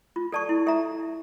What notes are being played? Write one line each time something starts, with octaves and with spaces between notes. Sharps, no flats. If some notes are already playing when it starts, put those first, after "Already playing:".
F4
A4 D5 A5 C#6
E4
A4 E5 A#5